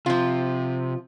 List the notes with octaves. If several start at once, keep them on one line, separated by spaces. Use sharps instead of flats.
C3 F3 F4